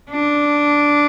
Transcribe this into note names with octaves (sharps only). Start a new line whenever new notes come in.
D4